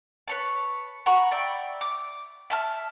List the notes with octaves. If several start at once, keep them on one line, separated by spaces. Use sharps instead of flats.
B4 C#5 A5
F#5 A#5 B5 C#6
D5 E5 G5
D6
E5 A5 F6